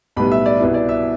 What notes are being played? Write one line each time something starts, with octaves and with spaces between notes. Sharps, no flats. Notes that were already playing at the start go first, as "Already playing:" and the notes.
B1 A2 G3 B3 B5
E5
D5
C2 B2 B3 E4
D5
E5